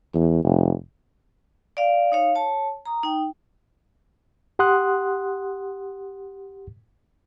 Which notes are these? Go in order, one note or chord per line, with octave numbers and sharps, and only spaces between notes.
E2
F1
D5 F5
D#4 C#5 F5
C#5 A5
A#5 D#6
D#4 G5
G4 F#5 C6 D#6 F#6